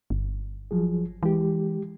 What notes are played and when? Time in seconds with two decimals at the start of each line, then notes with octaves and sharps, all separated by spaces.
0.10 G1
0.71 F3 F#3 G#4
1.23 E3 G#3 G4